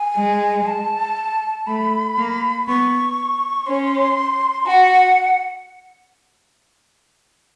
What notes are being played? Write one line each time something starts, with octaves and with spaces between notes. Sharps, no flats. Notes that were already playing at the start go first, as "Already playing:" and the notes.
Already playing: G#5
G#3
A5
A3 B5
A#3
B3 C#6
C#4 C6
F#4 F#5 G5